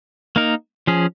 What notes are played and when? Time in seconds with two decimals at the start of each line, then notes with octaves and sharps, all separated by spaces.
0.36 A#3 D#4 A#4
0.87 F3 C#4 G#4